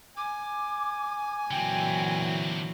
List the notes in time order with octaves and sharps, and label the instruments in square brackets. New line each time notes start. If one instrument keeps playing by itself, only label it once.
[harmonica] G#5 [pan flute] D6
[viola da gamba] A#2 E3 F#3 [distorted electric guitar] D3 C4 [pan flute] G5